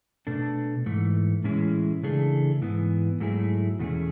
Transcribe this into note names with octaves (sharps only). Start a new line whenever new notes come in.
B2 A3 D4 A4
G#2 E3 A3
A2 E3 G#3 C#4 E4
C#3 E3 A3 D4 G#4
G#2 E3 B3
G#2 F#3 A3 E4 G#4
E2 B2 A3 C#4 G#4